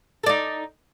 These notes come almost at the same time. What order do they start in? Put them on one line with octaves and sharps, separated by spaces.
A4 D5 D#4